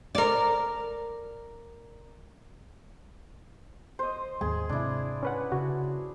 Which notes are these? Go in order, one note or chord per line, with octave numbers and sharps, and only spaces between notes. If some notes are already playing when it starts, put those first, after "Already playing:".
A#4 D5
C5 D#5
D#2 G#2 G#3 G#4 C6
G#2 C3 D4 E4
C#4 B4 F#5
C#3 F#4